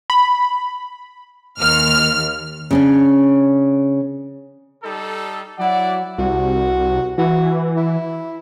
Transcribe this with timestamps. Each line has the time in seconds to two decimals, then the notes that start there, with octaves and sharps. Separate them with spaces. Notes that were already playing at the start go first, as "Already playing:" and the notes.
0.10 B5
1.61 D#2 F6
2.71 C#3 C#4 D4
4.83 G3 D#4 A4
5.59 F#3 E4 D5 F#5
6.18 C2 F#4
7.18 E3 F#4
7.76 E4